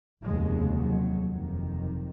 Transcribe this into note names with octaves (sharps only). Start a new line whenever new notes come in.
F1 D#2 C#3 G#3
F#3
F#1 F2 C3 D#3